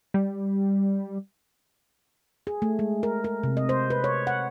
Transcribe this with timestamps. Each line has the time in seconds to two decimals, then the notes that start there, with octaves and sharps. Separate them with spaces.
0.14 G3
2.47 G#4
2.62 A3
2.79 G#3
3.03 A#4
3.24 A#4
3.43 C3
3.57 D#5
3.69 C5
3.90 B4
4.04 C#5
4.27 F#5